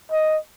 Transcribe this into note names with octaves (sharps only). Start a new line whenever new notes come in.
D#5